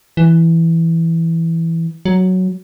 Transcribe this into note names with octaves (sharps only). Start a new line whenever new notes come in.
E3
F#3